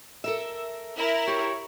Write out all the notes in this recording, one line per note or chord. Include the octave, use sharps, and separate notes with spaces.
A4 A#4 E5
E4 A#4
G4 C#5